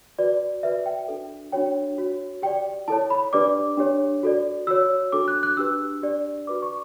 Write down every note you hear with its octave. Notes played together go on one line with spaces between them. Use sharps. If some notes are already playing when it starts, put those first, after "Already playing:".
F#4 B4 D5
F#4 B4 D5 E5
G5
D4 F#4 A4
D4 F#4 C#5 G5
F#4 C#5
G4 D5 G5
E4 A4 C#5 A5
B5
D4 G4 B4 D5 D6
D4 G4 C#5
F#4 A4 D5
F#4 C#5 E6
D4 F#4 A4 D6
F#6
F#6
D4 G4 B4 E6
D4 G4 D5
F#4 B4 D5 D6
C#6